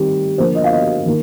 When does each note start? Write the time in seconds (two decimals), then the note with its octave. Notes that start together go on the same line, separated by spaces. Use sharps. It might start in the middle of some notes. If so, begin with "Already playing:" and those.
Already playing: D#3 G3 C4 G4
0.38 D3 F3 A#3 C5
0.55 D#5
0.64 F5
0.72 D#5
1.06 D#3 A#3